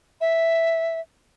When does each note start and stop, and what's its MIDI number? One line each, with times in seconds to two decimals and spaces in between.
0.21 1.00 76